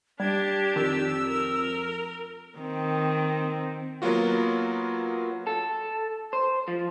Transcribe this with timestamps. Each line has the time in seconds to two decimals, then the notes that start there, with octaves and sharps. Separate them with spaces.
0.20 G3 D4 G4 G#6
0.76 F2 D#3 E6
1.25 A#4
2.58 D#3 C4
4.02 F#3 A#3 B3 F4 F#4
5.47 A4
6.33 C5
6.68 F3